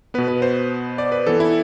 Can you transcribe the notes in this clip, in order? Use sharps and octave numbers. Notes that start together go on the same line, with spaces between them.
B2 B3 B4
B4
C5
D5
B4
E3 B3 A4
E4